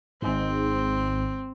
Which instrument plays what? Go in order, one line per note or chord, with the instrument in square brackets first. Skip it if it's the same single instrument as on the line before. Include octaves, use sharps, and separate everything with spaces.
[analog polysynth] G#1 G#2 [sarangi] C4